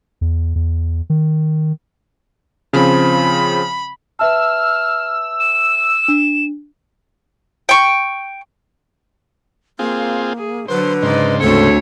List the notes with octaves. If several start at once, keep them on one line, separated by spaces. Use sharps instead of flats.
E2
E2
D#3
C#3 F3 C4 B5
B4 E5 A5 E6 F6
E7
D4
G5 C#6
A#3 C4 F4 G#4
G#4
D3 F#3 B4 C5
G#2 C#3 D#4 C5 D5
D2 C4 D4 A4 C#5